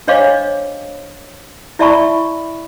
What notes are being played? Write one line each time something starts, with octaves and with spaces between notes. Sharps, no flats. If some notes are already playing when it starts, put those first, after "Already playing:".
D4 C5 C#5 D#5 F5 D6
E4 D5 E5 A5 B5 C#6